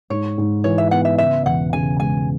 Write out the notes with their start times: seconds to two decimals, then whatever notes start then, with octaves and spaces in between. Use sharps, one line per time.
0.10 G#2 C#5
0.38 G#2
0.64 E3 C#5
0.78 E5
0.91 B3 F#5
1.05 E5
1.18 C#3 E5
1.45 E1 F#5
1.73 C#3 G#5
2.00 G#3 G#5